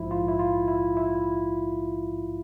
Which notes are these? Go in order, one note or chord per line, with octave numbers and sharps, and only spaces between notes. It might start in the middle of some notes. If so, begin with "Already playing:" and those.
Already playing: A#1 G#2 F3 E4
F4
E4
F4
E4
E4